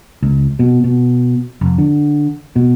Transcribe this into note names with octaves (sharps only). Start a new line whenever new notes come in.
C#2
B2
B2
F1
D3
B2